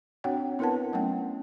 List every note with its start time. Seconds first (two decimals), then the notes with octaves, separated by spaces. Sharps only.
0.24 C4 D4 F#4 C#5 F#5 G5
0.59 B3 E4 A#4 B4 F#5 A5
0.93 F#3 A3 B3 C#4 F#5 G5